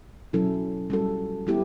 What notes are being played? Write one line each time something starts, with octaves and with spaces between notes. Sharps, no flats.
B2 F#3 C#4 E4 A4
G3 C#4 F#4 A4
G3 B3 E4 G4